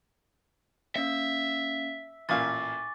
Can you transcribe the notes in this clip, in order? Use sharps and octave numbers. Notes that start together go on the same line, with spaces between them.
A#3 C#4 E5 F5
A1 A#2 F5 G#5 C#6 D6 A6